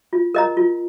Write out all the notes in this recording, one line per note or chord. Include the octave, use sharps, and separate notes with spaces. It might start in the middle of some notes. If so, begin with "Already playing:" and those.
F4
A#4 D#5 A#5
F4